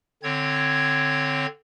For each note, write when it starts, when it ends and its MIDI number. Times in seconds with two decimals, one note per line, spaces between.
0.23 1.46 50
0.23 1.46 60
0.23 1.46 73
0.23 1.46 92